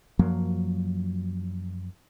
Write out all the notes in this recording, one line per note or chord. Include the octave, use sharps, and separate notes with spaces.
F#2 F3 F#3 A#3